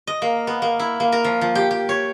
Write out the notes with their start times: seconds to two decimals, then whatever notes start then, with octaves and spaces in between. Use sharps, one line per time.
0.07 D#5
0.22 A#3
0.47 B3
0.62 A#3
0.79 E4
1.00 A#3
1.12 A#4
1.24 F3
1.41 F3
1.55 G4
1.71 G4
1.89 C#5